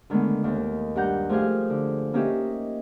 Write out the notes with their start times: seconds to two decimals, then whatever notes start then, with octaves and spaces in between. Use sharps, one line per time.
0.10 D3 D#3 G#3 A3 B3
0.44 D#2
0.96 G2 G4 F#5 A#5 G6
1.29 F3 A3 G4 G#4 F5
1.70 D3
2.14 A#3 C#4 D#4 G4 D#5 E5